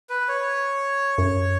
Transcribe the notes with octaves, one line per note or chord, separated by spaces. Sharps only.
B4
C#5
F#2